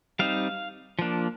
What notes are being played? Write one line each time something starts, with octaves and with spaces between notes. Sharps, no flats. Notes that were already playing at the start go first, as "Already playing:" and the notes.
G3 C4 D#4 F5
F3 A#3 D4